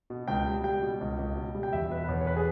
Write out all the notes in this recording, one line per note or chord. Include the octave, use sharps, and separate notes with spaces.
B2
C#2 G5
G3
G3 G5
B2
C#2
C#2
B2
G3
G5
E2 E5
B2 B4
B4
E2 C#5
C#5
B4
G#4